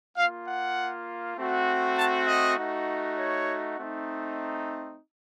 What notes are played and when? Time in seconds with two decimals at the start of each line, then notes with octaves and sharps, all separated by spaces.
0.15 A#3 F4 F5
0.46 F#5
1.36 A3 C4 F#4
1.97 A5
2.27 D#5
2.57 A3 D#4 F#4
3.18 C#5
3.79 A3 C4 D#4